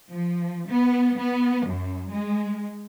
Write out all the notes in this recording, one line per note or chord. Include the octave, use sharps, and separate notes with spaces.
F3
B3
B3
F#2
G#3